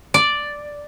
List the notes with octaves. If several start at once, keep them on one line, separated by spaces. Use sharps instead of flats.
D5